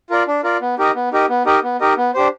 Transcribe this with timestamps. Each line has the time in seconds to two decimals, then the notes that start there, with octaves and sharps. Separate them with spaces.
0.10 F4 A#4 D5
0.27 D4
0.44 F4 A#4 D5
0.61 B3
0.79 D#4 G4 A#4 D#5
0.96 B3
1.12 D#4 G4 A#4 D#5
1.29 B3
1.46 D#4 G4 A#4 D#5
1.63 B3
1.80 D#4 G4 A#4 D#5
1.97 B3
2.14 D4 G4 C5